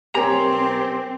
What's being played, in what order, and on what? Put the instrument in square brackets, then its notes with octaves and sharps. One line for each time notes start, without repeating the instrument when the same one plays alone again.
[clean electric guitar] B1 C#5 A#5 [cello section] C4 [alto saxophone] G4 [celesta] A#4 G#5